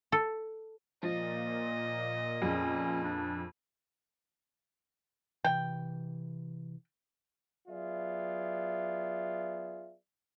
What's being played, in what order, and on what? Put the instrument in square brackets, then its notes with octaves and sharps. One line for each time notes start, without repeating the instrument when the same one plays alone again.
[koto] A4
[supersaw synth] A#2 [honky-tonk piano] F3 [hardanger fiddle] D#5
[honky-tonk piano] F2 G#4 [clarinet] C#4
[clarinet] D4
[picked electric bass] C3 E3 [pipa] G5
[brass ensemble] F#3 B3 F4 G#4 D5 E5